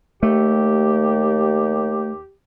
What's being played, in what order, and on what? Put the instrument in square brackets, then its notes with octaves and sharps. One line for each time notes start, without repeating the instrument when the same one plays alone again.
[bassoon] D#2 [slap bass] A3 [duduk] G4